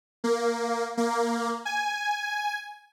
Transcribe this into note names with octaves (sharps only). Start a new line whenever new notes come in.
A#3
A#3
G#5